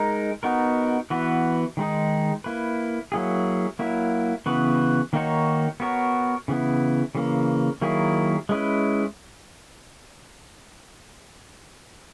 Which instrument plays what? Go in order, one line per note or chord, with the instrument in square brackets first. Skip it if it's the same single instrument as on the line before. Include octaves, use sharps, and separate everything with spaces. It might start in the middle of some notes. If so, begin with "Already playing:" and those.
Already playing: [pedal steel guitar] G#3 D#4 A#4
B3 D#4 F#4 A#4
E3 B3 F#4 B4
D#3 G#3 D#4 G#4
A#3 E4 B4
F#3 A#3 E4 G#4
F#3 A#3 E4
C#3 E3 B3 F#4 B4
D#3 A#3 D#4 F#4 C#5
B3 F#4 A#4 C#5
C#3 E3 B3 E4
C#3 E3 A#3
D#3 F#3 A#3 E4 G#4
G#3 C#4 E4 B4